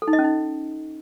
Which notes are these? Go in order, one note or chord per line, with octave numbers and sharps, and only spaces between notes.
A4
D#4
D#5
C#4
D#4